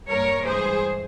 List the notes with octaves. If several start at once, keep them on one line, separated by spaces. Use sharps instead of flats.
G2 G3 A#3 A#4 C#5
G2 E3 G#3 G#4 C5